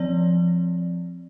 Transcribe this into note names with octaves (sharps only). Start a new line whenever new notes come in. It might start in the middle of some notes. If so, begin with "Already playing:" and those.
Already playing: F3 C4 D5